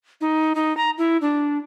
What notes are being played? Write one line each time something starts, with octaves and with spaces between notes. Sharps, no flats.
D#4
D#4
A#5
E4
D4